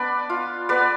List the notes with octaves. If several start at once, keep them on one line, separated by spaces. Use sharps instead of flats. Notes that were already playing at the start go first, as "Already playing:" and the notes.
Already playing: B3 D4 B4 D5
F4
B3 B4 D5